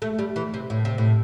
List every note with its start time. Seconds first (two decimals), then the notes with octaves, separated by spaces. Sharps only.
0.02 A3
0.19 G3
0.36 E3
0.54 C3
0.70 A2
0.85 C3
0.98 A2